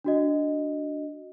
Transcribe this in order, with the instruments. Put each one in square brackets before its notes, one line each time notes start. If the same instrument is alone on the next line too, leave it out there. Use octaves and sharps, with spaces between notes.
[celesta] D4 F#4 D#5